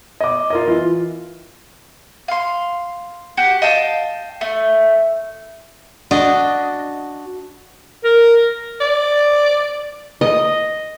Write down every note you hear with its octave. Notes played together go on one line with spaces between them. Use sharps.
D#5 D6
F4 A#4 D#5
E3 F4
F5 C6
F#4 G4
D#5 F5 G5 A5
A3
D4 F#4 D#5
A#4
D5
D#5